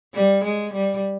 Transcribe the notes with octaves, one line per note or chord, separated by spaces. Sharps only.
G3
G#3
G3